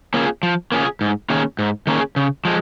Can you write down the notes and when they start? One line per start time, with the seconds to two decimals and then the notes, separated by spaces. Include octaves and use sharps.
0.14 A#3 C#4 F4 G#4
0.43 F3
0.72 A#3 C#4 F4 G#4
1.01 G#2
1.30 D#3 A#3 C#4 G#4
1.59 G#2
1.87 D#3 A#3 C#4 G#4
2.16 C#3
2.45 F3 G#3